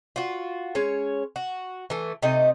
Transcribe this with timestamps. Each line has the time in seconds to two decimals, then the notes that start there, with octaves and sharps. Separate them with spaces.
0.16 F4 F#4
0.75 G#3 C#4 C#5
1.36 F#4
1.90 E3 A3
2.22 C3 A3 D#4 D#5